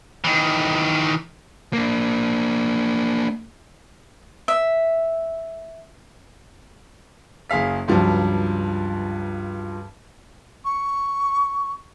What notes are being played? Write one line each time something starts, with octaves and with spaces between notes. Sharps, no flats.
D#3 E3
A#3 D4
E5
F#1 G#4 F5 B6
C#2 G2 F3 F#3
C#6